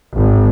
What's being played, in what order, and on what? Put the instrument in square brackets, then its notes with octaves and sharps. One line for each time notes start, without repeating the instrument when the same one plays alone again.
[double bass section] G#1